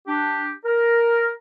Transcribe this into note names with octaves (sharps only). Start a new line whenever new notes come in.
D4 G4
A#4